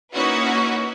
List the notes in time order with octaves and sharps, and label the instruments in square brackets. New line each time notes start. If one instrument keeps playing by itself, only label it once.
[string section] A#3 C#4 D#4 E4 F#4 B4